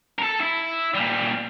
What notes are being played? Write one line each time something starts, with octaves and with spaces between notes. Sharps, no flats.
A4 A#4
E4
A#2 G3